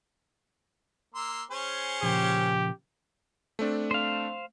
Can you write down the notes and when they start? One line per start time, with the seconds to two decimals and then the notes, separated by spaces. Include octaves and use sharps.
1.15 A#3 C6 E6
1.51 C#4 G#4 C5
2.02 A#2 C#3 F3 G4
3.59 A3 C4 D4
3.91 C5 F5